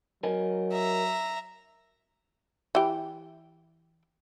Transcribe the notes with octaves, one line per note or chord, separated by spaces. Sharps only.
F#3 A#4 D#5 G#5
E5 A#5
E3 G4